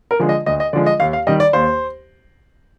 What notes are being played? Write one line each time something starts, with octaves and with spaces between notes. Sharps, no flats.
A#4
D3 F3 G#3
D#5
D2 D#5
D#5
D3 F3 G#3 D5
D#5
D#2 F5
F5
D#3 G3 D#5
D5
D#2 C5